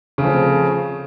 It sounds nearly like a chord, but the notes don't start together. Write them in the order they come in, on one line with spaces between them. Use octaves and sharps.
C#3 A3 F3 C#4 C4